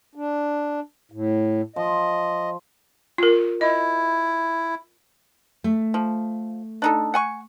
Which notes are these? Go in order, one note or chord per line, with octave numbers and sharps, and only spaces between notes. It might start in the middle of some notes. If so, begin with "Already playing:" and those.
D4
A2
F3 D#5
F4 A#4
E4 D#5
A3
F3
D4 D#4 A4
F#5 G#5 C#6